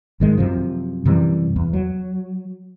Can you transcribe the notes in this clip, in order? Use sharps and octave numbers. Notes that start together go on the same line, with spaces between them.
G#1 D#3 G#3
F#2 C3 F3
F#2 C3 E3 G3
E2
F#3